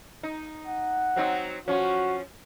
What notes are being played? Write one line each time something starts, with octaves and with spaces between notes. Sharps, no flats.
D#4
F#5
F#3 C4 D#4
F3 C#4 F#4